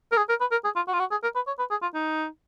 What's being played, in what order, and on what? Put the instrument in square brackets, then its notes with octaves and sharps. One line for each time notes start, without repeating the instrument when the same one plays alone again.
[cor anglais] A#4
G#4
A#4
B4
A#4
G#4
F4
F#4
F4
F#4
G#4
A#4
B4
C#5
B4
G#4
F4
D#4